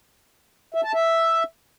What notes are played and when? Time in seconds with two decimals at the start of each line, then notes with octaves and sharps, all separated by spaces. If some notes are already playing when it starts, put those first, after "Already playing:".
0.74 E5
0.84 A5
0.94 E5